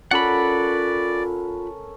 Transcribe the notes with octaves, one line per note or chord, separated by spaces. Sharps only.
C#4 F4 A4 A#4 D5 F#5 B5